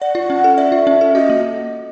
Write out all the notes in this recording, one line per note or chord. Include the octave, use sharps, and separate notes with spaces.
D5 F#5
F4
C#4
A4
D5 E5
F4
C#4
A4
F#4 D#5
A#3